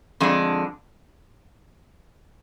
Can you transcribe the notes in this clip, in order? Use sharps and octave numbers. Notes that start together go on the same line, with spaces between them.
F2 D3 G#3 D4